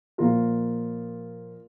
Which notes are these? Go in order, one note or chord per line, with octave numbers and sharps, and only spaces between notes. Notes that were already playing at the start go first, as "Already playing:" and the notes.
A#2 F3 A#3 F4 A#4